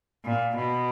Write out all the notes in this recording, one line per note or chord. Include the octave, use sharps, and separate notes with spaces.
A#2
B2